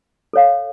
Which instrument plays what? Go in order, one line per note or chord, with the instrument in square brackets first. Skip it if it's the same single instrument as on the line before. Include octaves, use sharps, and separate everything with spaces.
[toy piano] A4 C#5 F5